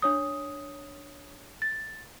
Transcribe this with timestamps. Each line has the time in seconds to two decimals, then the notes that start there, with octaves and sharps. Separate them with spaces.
0.02 D4 C#5 D#6
1.62 A6